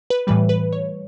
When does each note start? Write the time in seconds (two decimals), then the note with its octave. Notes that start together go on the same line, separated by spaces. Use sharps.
0.10 B4
0.27 A2 E3 G3 B4
0.49 B4
0.73 C#5